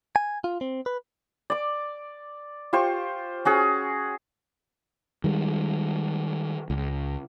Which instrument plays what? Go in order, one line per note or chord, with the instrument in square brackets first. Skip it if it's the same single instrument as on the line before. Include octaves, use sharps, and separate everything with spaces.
[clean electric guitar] G#5
F4
C4
B4
[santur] D5 D6
F4 G4 C5 C#6
C#4 F#4 G#4
[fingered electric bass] D#3 G3 G#3
C#2